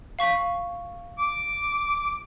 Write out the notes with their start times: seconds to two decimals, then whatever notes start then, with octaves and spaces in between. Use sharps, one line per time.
0.19 F5 C#6 B6
1.19 D6